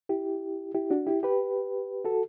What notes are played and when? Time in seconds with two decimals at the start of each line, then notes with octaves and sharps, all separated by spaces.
0.09 E4 G4
0.75 E4 G4
0.90 D4 F#4
1.07 E4 G4
1.23 G4 B4
2.05 F#4 A4